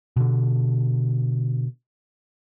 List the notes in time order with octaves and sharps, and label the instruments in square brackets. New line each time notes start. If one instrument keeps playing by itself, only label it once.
[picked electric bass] B2 D3